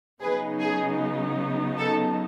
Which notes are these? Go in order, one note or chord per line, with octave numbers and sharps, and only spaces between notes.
C#3 F#3 B3 D#4 G#4 B4
G#4
A4